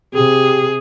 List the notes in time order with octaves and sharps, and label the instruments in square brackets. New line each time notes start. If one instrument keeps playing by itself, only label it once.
[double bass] C3 [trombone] G4 [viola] G#4